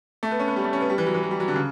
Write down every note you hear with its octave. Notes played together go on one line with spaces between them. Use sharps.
A3
B3
C#4
B3
G3
A3
C#4
B3
G3
E3
F#3
E3
F#3
G3
F#3
D3
C#3